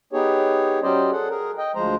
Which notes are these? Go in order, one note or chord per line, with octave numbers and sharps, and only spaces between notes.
B3 D#4 G4 G#4 C#5
F#3 C#4 G4 C5 D5 D#5
G#4 A4 F#5
G#4 A#4
D#5 G5
D2 F3 G#3 C5 A#5